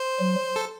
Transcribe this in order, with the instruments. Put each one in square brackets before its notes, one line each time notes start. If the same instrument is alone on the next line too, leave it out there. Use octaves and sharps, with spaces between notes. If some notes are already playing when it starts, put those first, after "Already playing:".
Already playing: [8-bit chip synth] C5
[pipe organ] F#3
[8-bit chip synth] A4